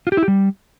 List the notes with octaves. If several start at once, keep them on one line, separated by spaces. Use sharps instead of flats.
F4
G4
E4
G4
G3